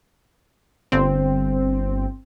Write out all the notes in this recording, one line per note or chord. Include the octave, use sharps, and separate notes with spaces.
G1 C4